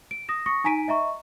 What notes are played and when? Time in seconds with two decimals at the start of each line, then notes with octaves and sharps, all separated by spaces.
0.11 D7
0.28 D#6 A#6 E7
0.46 C#6 D#6 A#6 C#7
0.64 D#4 G#5 A#5 B6 D7 D#7
0.88 D#5 E5 A#5 C#6